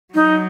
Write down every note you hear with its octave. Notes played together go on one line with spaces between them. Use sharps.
F#3 D#4